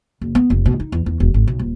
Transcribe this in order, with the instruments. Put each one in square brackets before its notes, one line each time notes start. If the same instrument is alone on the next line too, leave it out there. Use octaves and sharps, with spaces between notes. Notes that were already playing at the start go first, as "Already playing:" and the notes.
[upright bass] F#1
B3
F1
B2
D#4
E2
E2
E1
G#1
B1
D#1